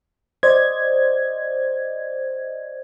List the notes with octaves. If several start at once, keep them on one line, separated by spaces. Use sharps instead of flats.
C5 D5 D#5 G#6